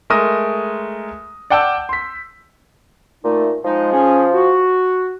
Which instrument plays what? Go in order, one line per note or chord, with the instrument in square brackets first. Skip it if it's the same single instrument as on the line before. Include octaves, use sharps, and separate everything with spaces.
[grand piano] G#3 A3 A#4 D#6 A#6
D5 F#5 G5 A5 E6 G6
C6 B6
[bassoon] A#2 [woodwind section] A3 D#4
[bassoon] F3 [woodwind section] G#3 D#4
[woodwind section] C#4 G#4
F#4